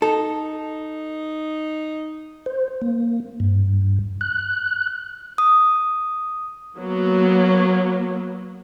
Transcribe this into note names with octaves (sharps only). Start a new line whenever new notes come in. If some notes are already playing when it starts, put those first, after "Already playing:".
D#4 A4
C5
A#3
G2
F#6
D#6
F#3 A#3 B3